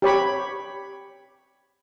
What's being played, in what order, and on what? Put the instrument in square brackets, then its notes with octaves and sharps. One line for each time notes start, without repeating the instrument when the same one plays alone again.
[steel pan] G4 C#5 B5